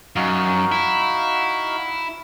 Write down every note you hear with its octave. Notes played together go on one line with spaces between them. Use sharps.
F#2 D#4 F#4 F5
E4